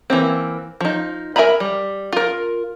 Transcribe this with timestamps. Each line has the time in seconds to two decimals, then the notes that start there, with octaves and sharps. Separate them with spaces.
0.10 E3 A#3 C4
0.81 F3 D#4
1.36 A#4 E5 G#5 A#5 B5
1.60 G3
2.12 F4 A#4